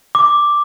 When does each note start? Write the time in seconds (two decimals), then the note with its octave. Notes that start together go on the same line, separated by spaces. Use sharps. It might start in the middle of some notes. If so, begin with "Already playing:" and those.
0.15 D6